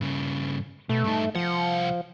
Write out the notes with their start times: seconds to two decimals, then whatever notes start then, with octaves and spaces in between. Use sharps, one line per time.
0.01 G2 C#3
0.89 B2 A3
1.04 G2 D#4
1.35 C2 F3 F#5